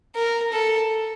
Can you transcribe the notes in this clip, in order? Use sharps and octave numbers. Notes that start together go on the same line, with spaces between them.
A#4
A4